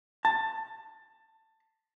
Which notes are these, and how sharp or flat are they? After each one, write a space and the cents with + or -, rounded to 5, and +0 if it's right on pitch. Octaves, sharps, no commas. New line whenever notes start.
A5 +15